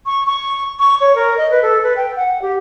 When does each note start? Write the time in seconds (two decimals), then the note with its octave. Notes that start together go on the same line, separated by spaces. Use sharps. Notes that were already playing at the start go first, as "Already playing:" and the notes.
0.06 C#6
0.27 C#6
0.79 C#6
1.00 C#5
1.15 A#4
1.37 D#5
1.51 B4
1.62 A4
1.83 B4
1.96 G5
2.16 F#5
2.42 G4